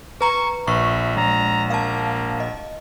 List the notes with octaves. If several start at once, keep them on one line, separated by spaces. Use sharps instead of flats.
B4 A#5 C#6
A#1 E5 C#6
A#1 G#3 A#5
A#3 F5 A5
D#5